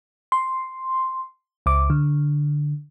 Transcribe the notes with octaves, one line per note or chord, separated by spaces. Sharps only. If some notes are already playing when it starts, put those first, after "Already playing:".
C6
C#2 D6
D3